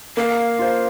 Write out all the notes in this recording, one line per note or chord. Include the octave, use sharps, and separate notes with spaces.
A#3 F5
F4 C5